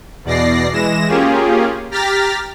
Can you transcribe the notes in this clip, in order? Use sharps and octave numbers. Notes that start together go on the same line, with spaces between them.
E2 B2 D5 A#6 C7
E3 G#3 A#6 E7
A#3 C#4 F4 G4 G#4
G4 A#5 F6 A6 B6